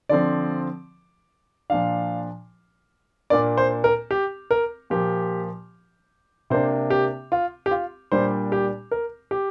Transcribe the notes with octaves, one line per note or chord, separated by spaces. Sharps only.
D3 F3 C4 D5
A#2 F3 D4 F5
A#2 A#3 D4 D5
C5
A#4
G4
A#4
A#2 F3 A#3 G4
C3 A#3 D4 C5
G4
F4
G4
F4
A#2 G3 A#3 D4 C5
G4
A#4
G4